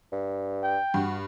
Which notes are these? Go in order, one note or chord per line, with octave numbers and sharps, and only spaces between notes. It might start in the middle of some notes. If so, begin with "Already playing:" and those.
G2
G5
G2 F#4